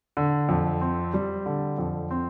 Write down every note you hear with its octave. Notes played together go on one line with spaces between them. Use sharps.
D3
F2
C4
G3
D3
F2
C4